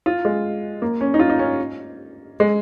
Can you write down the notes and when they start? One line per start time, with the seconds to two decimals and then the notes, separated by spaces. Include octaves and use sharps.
0.06 F4
0.25 G#3
0.82 A#3
1.01 C#4
1.14 D#4
1.19 F4
1.30 D#4
1.39 C#4
2.40 G#3